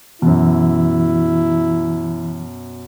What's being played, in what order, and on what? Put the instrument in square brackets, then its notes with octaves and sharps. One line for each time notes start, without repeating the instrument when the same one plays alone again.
[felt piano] F#2 B2 [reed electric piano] E3 [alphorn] E4